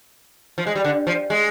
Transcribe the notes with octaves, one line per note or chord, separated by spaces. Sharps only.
F3
G#3
G3
D3
F3
G#3